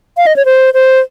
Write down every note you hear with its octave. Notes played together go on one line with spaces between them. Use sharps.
F5
D#5
C#5
C5
C5